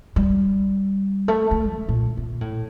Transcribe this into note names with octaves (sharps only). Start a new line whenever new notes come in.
G3
A3
A3
C#3
A#2
A#2
A2